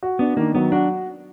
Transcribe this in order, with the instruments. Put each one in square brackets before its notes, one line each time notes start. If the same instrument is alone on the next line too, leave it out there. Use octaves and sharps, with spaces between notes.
[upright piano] F#4
[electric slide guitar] B3 [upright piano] D4
[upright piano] D#3 [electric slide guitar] A#3
[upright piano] F#3 [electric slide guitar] B3
[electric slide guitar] D4 [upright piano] F#4